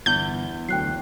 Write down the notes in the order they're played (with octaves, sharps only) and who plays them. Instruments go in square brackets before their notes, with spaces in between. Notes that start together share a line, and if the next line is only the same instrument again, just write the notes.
[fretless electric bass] G1 [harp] E2 [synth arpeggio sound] G6
[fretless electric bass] D2 F#3 [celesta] G5 F#6 C7